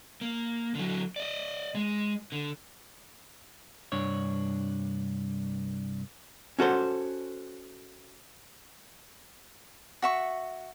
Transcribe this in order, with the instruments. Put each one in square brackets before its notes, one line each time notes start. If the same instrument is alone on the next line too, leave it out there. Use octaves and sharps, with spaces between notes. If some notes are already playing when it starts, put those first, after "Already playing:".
[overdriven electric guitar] A#3
D3 F#3
D5 D#5
G#3
D3
[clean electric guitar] C2 G2 D4 C#5
[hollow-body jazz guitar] C#4 F#4 A4 C5
[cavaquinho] F#4 E5 C#6